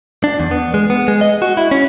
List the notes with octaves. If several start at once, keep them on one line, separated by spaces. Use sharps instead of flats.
D4
E2
B3
G#3
B3
G#3
D#5
F#4
E4
C#4